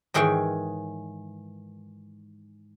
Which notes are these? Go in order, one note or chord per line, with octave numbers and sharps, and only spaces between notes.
G#2 D#3 E3 G#4 C#5 G5